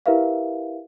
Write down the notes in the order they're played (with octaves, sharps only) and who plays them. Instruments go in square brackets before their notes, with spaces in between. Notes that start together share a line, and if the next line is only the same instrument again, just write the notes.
[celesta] E4 G4 A#4 B4 E5 F5